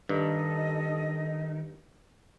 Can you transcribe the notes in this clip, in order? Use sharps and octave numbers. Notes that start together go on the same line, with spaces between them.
G2 D#3 A4 D#5